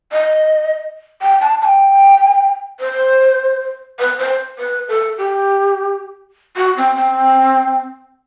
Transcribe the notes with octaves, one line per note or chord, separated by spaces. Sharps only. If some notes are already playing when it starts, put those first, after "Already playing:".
D#5
G5
A5
A5
G5
C5
B4
C5
B4
A4
G4
F#4
C4
C4